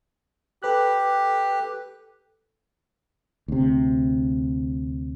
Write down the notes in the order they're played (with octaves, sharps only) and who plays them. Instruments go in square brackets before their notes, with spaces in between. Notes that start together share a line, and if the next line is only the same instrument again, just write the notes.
[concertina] G4 [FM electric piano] A4 B4 F#6
[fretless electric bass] D2 C3